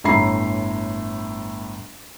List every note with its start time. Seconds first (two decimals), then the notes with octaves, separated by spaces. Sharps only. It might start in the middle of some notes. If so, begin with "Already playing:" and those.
0.04 G1 A2 E5 A#5 B5 C7